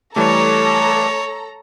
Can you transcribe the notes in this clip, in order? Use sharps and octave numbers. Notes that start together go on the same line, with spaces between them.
E3 G3 A3 A4 C#5 A5 A#5 D6